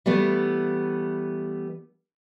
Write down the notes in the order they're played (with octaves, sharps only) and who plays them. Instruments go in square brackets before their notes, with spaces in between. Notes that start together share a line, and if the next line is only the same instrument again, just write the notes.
[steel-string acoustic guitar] E3 G3 A3 B3